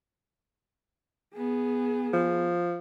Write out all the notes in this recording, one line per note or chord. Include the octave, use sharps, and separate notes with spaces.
B3 G#4
F3